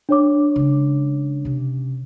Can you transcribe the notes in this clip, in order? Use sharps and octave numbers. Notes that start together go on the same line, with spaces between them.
D4 C#5 D6
C#3 G#3
C3 C#4